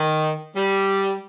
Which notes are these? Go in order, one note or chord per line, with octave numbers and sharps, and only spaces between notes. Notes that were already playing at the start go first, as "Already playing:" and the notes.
Already playing: D#3
G3